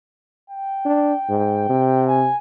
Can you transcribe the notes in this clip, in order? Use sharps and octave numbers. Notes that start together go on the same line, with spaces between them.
G5
D4
G#2
C3
G#5